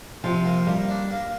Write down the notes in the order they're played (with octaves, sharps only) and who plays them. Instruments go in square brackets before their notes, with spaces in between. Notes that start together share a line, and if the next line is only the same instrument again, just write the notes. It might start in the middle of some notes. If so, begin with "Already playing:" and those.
[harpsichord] C3 [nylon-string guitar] F3
[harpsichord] A#3
[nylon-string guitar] G3 [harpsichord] A#3
[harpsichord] D4
A#3